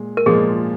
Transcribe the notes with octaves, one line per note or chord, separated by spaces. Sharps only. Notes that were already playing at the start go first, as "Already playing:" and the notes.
Already playing: A#2 G#3
A#4
A#2 F3 G#3 G#4